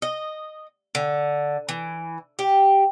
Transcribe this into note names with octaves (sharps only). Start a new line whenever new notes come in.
D#5
D3
E3
G4